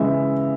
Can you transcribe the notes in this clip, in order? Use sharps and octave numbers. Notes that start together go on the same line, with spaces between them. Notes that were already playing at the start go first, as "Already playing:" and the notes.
Already playing: C#3 E3 G#3 E5